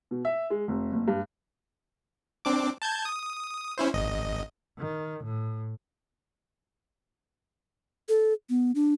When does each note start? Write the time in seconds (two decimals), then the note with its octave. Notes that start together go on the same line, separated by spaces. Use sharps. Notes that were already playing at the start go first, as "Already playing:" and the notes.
0.11 B2
0.25 E5
0.50 G#3
0.68 F1
0.92 F#1
1.08 G2
2.45 C4 D4 D6
2.82 A5 G6 G#6
3.05 D#6
3.78 C#4 E4 C5
3.94 G#1 D#5
4.79 D#3
5.24 A2
8.09 A4
8.49 B3
8.75 D4